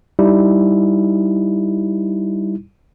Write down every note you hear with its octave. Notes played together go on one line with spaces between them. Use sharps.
G3 D#4 E4